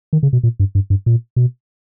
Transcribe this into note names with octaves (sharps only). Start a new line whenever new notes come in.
D#3
C#3
B2
A#2
G2
G2
G2
A#2
B2